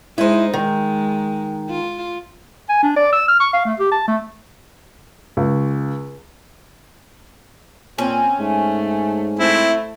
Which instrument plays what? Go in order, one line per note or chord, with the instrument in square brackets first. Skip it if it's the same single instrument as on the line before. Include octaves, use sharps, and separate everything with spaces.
[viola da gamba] G#3 D#4 [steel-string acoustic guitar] E4 C5
[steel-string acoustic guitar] D#3 [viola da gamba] G#3
[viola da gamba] F4
[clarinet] G#5
D4
D5
E6
F6
C#6
F5
A3
G4
A5
A3
[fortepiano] C#2
[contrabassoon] A#2 [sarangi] C4 [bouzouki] C#4
[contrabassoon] G#2 [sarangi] A3
[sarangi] A3 [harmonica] C4 E4